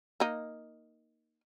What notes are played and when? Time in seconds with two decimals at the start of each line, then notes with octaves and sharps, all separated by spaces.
0.20 A#3 D#4